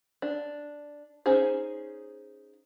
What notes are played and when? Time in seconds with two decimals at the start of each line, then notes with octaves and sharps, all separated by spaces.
0.22 D4
1.26 C#4 D#4 G#4 C5